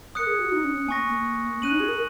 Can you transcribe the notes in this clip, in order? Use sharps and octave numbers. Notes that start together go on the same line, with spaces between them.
A#4 D#6 F#6 C#7
G#4
F#4
D#4
C#4
C#4
A#3 G#5 C#6 A#6
A#3
C#4 F#6 D#7 F#7
D#4
G#4
A#4